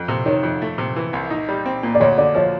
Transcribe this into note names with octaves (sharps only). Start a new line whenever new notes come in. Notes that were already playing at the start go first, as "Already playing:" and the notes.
Already playing: F2
C3
D#3 C#5
F2
A3
C3
E3
C2
D#4
G3
C4
A#2
D5
D2 C#5
D3 D5
F3 C#5